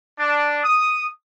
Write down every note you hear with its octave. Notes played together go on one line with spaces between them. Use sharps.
D4
D#6